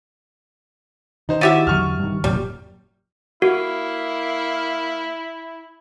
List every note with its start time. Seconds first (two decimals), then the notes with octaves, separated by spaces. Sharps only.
1.29 D#3 D#4 C5
1.41 E4 F#4 G4 E5 A6 D#7
1.67 E2 D3 F#3 C#6 F6
1.99 G2 D#3
2.24 F1 F#2 A#2 G3
3.42 A#3 E4 F#4